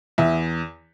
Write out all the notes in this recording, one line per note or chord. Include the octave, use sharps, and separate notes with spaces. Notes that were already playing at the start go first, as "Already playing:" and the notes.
E2 E5